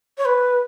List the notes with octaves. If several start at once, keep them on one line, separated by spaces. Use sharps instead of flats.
C#5
B4